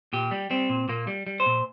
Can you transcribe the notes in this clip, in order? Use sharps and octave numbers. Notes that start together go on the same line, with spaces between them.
A#2 G4
G3
G3 C4
A#2
A#2 A#3
G3
G3
C5
A#2